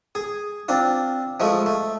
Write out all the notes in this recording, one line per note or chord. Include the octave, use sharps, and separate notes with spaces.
G#4
C4 D4 F4
F3 G#3 A3
A3